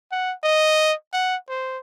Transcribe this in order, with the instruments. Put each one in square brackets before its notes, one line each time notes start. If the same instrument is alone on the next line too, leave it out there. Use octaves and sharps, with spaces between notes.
[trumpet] F#5
D#5
F#5
C5